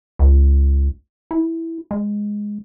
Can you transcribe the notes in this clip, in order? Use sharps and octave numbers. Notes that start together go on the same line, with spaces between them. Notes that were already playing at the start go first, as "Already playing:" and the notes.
C#2
E4
G#3